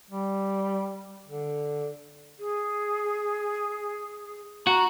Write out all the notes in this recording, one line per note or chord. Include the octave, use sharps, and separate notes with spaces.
G3
D3
G#4
F#4 A#5